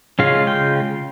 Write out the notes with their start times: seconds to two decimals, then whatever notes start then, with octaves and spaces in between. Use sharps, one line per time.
0.19 C#3 G#3 C#4 F4 F5
0.47 G5